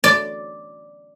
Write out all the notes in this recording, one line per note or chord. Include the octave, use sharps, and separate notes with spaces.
D5